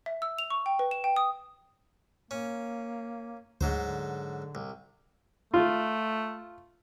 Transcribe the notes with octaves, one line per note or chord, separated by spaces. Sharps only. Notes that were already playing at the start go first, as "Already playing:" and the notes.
E5
E6
F7
C#6
G5
B4
E7
G5
D#6
A#3 C#4
D2 G#2 F#3 C5
D3
C2
A3 F4